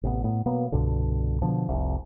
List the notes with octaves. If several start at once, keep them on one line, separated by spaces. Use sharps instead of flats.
A1 C3 B3
A2 B3
B2 F#3 A#3 B3
C2 G2 B2 D3
B2 D3 F3
F1 C2